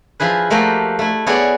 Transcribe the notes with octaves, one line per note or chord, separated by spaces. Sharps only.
F3 E4 G#4 B4
F3 A3 A#3 F#4 G4
A3 E4
B3 E4 F#4 G#4 C#5 D5